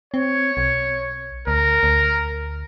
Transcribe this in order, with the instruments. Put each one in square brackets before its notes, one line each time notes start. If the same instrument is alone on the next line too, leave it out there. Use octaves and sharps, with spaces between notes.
[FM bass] C4 [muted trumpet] C#5
[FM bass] B1
[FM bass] D2 [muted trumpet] A#4
[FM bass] D2